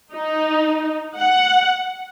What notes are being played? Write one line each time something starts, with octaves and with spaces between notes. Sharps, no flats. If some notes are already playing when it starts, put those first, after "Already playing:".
D#4
F#5